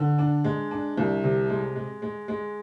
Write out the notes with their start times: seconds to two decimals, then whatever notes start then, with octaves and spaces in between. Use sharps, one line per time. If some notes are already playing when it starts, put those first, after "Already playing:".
Already playing: D3
0.18 D4
0.44 G#3
0.71 D4
0.97 C2
1.24 C3
1.49 G#3
1.76 G#3
2.02 G#3
2.28 G#3